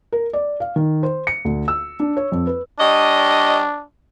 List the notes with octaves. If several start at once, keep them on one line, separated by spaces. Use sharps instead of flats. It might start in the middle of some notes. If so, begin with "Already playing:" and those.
A#4
D5
F5
D#3
C5
C#7
D2
E6
D4
C#5
F2
B4
G3 D4 C#5 D#5